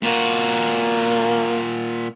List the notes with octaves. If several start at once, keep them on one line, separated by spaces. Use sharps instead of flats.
A#2 A#3 F#4